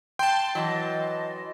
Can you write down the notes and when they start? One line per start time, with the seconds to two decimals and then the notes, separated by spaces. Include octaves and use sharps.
0.19 G5 A5 C6
0.55 E3 F#3 D#5